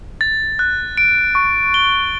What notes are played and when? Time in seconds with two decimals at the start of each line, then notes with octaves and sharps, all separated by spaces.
0.21 A6
0.59 F#6
0.97 D7
1.35 C#6
1.74 G7